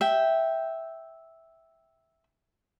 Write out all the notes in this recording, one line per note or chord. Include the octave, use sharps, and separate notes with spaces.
E5 G5